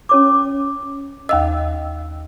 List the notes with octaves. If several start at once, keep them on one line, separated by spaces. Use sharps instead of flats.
C#4 C#5 D6
D#2 D#5 F5 E6